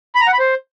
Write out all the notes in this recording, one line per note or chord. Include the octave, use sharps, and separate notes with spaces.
B5
A#5
F#5
B5
C5